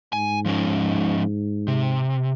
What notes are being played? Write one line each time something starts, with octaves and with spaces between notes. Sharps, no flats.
G#2 G#5
F3 G#3 C#4
C3